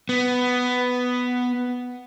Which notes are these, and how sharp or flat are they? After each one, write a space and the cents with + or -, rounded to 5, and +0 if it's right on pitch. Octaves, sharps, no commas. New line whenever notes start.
B3 +5